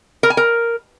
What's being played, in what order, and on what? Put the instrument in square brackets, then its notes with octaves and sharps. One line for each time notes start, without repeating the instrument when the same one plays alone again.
[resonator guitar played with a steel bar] A#4
G#5
A#4